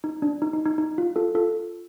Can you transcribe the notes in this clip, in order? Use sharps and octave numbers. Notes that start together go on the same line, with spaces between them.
D#4
D4
D#4
D#4
D#4
D#4
F4
F4 A4
F4 A4